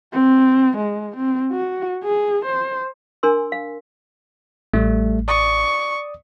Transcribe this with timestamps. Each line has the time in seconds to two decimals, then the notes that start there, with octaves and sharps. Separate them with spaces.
0.13 C4
0.77 G#3
1.17 C4
1.52 F#4
2.03 G#4
2.45 C5
3.23 D4 A#4 G#5 C6 E6
3.52 F5
4.73 A1 G3 A3
5.28 D5 C#6 D#6